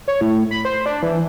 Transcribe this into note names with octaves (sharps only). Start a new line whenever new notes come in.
C#5
A2
B5
C5
D4
E3